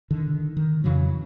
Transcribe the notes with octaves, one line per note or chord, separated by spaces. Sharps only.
D3 D#3
D#3
F2 C#3 E3 F#3